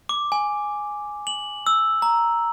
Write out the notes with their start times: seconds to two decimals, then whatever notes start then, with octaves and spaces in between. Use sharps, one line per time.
0.09 D6
0.32 G#5
1.27 F#7
1.67 E6
2.02 A#5